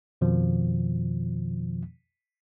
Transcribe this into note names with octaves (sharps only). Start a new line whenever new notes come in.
F2 B2 D#3 F3